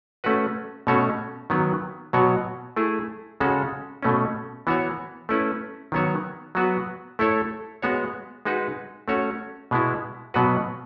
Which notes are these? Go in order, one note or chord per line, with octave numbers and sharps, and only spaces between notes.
A3 C#4 F#4 B4
B2 A3 C#4 F#4 C#5
D#3 F#3 B3
B2 F#3 B3 F#4 C#5
A3 E4 G#4
C#3 G#3 C#4 F#4 A4
B2 A3 C#4
E3 B3 F#4 C#5
A3 C#4 E4 B4
D#3 F#3 B3 F#4 C#5
F#3 B3 F#4 B4
A3 E4 A4 C#5
G#3 B3 F#4 C#5
G#3 D#4 F#4 B4
A3 C#4 F#4 C#5
B2 G#3 B3 E4
B2 F#3 B3 F#4 B4